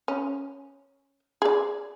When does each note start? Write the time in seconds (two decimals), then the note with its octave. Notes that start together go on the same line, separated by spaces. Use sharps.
0.08 C#4
1.42 G#4 D5